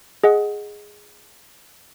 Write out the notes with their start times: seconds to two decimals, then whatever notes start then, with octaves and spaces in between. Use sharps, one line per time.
0.24 G#4 D#5 F#5